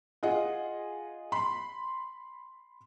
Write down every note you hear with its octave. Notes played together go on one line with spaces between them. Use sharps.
F4 G#4 D#5 F#5
B5 C6